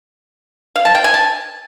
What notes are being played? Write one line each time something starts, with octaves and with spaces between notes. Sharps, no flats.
F5
A5
G5
G#5
A5